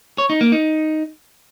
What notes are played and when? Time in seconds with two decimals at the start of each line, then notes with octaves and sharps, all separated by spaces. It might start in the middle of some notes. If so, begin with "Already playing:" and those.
0.18 C#5
0.30 D#4
0.41 A#3
0.52 D#4